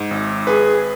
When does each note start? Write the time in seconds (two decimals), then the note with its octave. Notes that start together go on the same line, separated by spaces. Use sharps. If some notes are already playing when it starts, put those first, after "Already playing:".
Already playing: G#2
0.11 G#1
0.47 G#4 B4